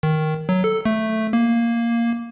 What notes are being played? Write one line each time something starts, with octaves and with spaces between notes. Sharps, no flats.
D#3
F#3
A4
A3
A#3